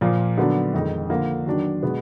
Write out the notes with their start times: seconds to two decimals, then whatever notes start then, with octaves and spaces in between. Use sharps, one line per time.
0.01 A#2 F3 A#3
0.38 D3 F#3 B3 D4
0.74 F2 D#3 G#3 D#4
1.10 D3 F3 A#3
1.46 D#3 F#3 D4
1.83 B2 G#3 B3